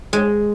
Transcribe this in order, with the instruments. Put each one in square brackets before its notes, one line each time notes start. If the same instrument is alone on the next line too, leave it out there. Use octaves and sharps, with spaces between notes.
[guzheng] G#3